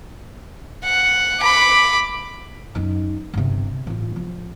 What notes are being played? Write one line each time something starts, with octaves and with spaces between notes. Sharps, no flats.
F#5
B5 D6
F#2 D#4
G1 C3
A1 F4
F3